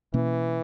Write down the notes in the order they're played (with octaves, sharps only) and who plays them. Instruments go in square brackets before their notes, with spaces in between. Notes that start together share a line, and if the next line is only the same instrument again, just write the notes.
[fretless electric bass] B2 A#3 C#4 [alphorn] E3